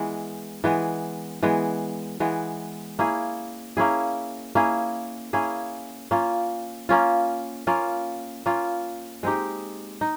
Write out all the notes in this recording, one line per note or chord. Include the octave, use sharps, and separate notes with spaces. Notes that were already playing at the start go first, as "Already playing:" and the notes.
Already playing: E3 G#3 B3
E3 G#3 B3
E3 G#3 B3
E3 G#3 B3
A#3 C#4 E4 G#4
A#3 C#4 E4 G#4
A#3 C#4 E4 G#4
A#3 C#4 E4 G#4
A#3 C#4 F4
A#3 C#4 F4
A#3 C#4 F4
A#3 C#4 F4
G#3 C4 D#4 G4
D#4